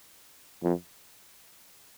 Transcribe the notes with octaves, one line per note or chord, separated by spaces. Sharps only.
F2